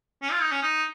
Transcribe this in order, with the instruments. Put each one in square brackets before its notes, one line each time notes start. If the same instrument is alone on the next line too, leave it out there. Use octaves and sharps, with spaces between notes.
[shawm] C#4
F4
D#4
C#4
D#4